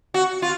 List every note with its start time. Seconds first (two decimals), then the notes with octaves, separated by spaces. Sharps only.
0.14 F#4
0.42 F4